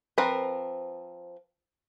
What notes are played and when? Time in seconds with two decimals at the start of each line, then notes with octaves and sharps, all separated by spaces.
0.18 F3 C4 A#4 B4